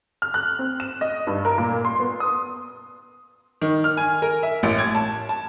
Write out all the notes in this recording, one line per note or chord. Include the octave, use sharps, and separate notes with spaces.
F6
F#6
C4
E7
D#5
G2
A#4
A#2
C6
B3
D#6
D#3
F6
G#5
A#4
E5
A1
G#6
A5
A5